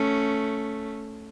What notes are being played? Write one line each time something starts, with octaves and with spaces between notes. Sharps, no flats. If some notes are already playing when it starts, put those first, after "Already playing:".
Already playing: A3 C#4